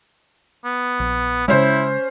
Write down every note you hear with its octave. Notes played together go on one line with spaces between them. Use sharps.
B3
A#1
C#3 G#3 C#4 E4 C5